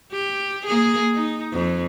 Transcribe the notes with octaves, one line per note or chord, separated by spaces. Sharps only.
G4
A#3 G#4
D#4
F2